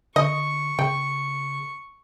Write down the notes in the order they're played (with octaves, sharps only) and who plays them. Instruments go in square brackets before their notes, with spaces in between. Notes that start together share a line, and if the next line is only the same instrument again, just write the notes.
[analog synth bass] D3 [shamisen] D#5 [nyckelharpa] C#6
[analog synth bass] C#3 [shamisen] G5